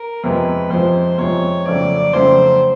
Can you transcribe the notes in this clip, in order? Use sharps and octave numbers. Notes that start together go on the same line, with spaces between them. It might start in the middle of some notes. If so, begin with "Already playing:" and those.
Already playing: A#4
F2 C3 F3 G#3 B4
F2 C3 F3 G#3 C5
F2 C3 F3 G#3 C#5
F2 C#3 F#3 A3 C4 D5
F2 C#3 F#3 A3 C4 C5